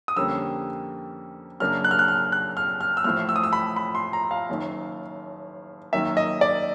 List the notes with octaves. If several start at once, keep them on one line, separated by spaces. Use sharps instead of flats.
D#6
F2 D3 G3 A#3 C#4 E6
F#2 C#3 F#3 A#3 D4 F6
F#6
F6
F#6
F6
F#6
F6
F6
E6
A1 A2 F3 F6
E6
D#6
E6
B5
B5
C6
A#5
F5
F#1 F#2 D#3
F#2 D#3 F#3 A#3 E5
D#5
D5